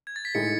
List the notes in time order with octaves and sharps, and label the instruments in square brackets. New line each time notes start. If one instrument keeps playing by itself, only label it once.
[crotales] G#6
A6
B6
[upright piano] A2 G#3 D#4 [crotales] C#7